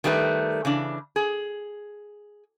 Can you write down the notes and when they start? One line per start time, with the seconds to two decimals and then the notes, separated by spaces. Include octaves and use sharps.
0.04 D#3 G3 A3 D#4 B4
0.65 C#3 E3 D4
1.16 G#4